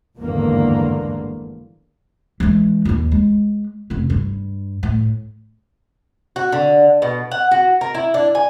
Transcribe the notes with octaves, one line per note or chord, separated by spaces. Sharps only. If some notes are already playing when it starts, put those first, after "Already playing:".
G#1 E2 G2 D3 A#3
E3 G#3
E1 D#2
G#3
F1 C#3
G2
A2
F#4
D3
B2
F#5
F#4
A#4
E4
D4
G#5